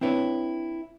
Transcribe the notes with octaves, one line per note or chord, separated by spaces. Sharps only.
C4 D4 E4 B4 C#5